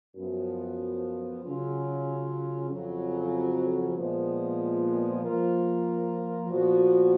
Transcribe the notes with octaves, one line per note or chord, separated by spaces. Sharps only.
F#2 F3 B3
C#3 F#3 C#4 F4
F2 C#3 F#3
A#2 F3 G#3 B3
F3 A#3 F4 A#4
A#2 F3 B3 F#4